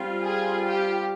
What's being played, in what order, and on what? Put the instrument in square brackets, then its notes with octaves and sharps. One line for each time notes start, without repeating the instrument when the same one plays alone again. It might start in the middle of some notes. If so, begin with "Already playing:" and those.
Already playing: [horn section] G3 C4 F4
[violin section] G#4
G4